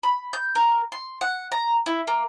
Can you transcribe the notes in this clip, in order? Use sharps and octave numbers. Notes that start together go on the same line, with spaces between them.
B5
G6
A#4
C6
F#5
A#5
E4
A#3